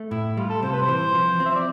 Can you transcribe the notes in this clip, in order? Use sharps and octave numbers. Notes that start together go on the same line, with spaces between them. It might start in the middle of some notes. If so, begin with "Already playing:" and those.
Already playing: A3
A2 E4
G3 F4
A4
C3 C5
B4
C5
E3
F3
C4
E5
D5